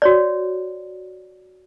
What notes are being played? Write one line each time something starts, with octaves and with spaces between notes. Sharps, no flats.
F#4 C#5 D5